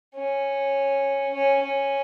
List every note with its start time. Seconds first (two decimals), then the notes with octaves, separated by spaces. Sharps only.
0.15 C#4
1.34 C#4
1.63 C#4